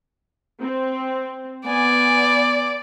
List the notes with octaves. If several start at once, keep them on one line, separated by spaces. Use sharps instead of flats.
C4
B3 D5 G#5